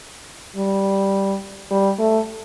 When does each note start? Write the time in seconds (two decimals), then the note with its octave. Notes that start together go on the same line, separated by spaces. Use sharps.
0.56 G3
1.71 G3
1.99 A3